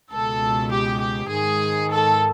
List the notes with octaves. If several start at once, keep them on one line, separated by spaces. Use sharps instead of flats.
C#2 B2 A4
G4
G4
G#2 D#3 G#4
A4